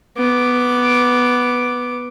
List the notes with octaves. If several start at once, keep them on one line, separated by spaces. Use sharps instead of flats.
B3 D6